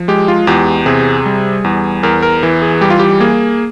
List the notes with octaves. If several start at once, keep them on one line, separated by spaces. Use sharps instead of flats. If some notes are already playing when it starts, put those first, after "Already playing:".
Already playing: F3
G#3 G4
F4
E2 G4
C3 G#4
G3
E2
E2 A#4
A#4
E3
G#4
G3 G4
F4
G4
A#3 G#4